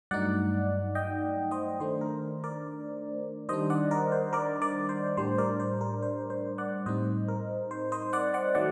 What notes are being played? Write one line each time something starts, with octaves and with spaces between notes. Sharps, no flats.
G2 F#3 A3 D#4 D5 F#5
D#5 G5
C5 D#5
D#3 A3 D4 C5
A#4
A#4 D5
D#3 G3 D4 C5 D#5
D5 F#5
A#4 D5
C5
A#4 D5
A#4 D5
C5
A2 G3 D4 C5
A#4 D5
C5
A#4
C5
C5
D5 F#5
A2 G3 C4 D#4 C5 D#5
A#4
C5
C5 D#5
D5 F#5
D5 F#5
D#3 F#3 A3 D5 F#5